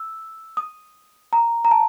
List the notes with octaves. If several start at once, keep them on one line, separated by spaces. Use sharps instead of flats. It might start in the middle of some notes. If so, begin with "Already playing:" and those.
Already playing: E6
D#6
A#5
A#5
A5